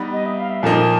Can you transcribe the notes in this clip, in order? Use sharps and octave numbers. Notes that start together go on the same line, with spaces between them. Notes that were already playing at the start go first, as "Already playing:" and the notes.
Already playing: G3 B3 D#4
D#5
E5
F5
E5
A#2 F3 A#3 D#4 A5